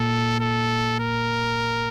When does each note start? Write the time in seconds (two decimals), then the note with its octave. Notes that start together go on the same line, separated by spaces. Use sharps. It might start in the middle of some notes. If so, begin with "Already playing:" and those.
Already playing: A#2 A4
0.40 A4
1.00 A#4